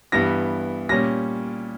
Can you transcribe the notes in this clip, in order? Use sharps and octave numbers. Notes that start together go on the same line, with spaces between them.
G2 E3 B3 A#6
A#2 G3 C#4 A#6